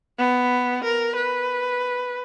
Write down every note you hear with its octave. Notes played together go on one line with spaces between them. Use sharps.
B3
A#4
B4